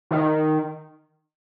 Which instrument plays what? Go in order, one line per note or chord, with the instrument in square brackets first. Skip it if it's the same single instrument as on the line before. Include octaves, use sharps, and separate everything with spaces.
[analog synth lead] D#3